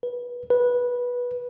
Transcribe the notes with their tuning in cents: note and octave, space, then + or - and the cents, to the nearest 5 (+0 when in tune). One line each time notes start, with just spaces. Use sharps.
B4 -20
B4 -15